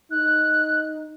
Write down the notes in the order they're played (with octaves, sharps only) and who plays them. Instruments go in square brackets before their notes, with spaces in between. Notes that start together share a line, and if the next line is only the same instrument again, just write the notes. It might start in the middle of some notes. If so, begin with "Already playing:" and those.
[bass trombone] D#4 [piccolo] F#6